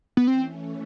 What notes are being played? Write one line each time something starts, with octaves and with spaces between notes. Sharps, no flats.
B3
E3 A3 C4 C#4